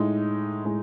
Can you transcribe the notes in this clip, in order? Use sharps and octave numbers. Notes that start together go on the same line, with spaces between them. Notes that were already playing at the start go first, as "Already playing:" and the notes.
Already playing: A2 G#3 D#4
A2 G#3